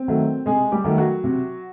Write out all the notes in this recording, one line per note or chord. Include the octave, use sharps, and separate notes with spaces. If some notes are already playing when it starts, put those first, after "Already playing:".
Already playing: C4
D#3 F#3 A3
C3 G#3 G#4
G3 G4
D#3 F#3 A3
F#3 F#4
C3